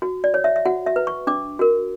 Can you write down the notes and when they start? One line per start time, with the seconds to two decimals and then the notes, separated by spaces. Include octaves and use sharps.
0.02 F#4
0.24 D5
0.34 C#5
0.44 E5
0.56 E5
0.65 F#4 F#5
0.86 E5
0.96 B4
1.07 C#6
1.27 D4 D6
1.59 F#4 A#4